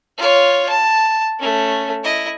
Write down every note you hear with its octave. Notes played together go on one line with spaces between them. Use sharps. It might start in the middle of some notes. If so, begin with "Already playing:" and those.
F4 C#5
A5
A3 C#4
E4 D#5